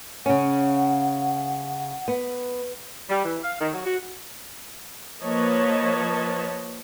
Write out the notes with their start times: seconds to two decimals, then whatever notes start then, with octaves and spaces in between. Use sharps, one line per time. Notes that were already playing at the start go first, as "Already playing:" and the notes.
0.26 C#3 C#4 F#5
2.08 B3
3.09 G3
3.25 E3
3.42 F5
3.60 D#3
3.73 F#3
3.85 F#4
5.23 F3 A#3 B4 C#5 D#5 A5